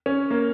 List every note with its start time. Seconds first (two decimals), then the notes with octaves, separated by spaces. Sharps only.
0.06 C#4
0.31 A#3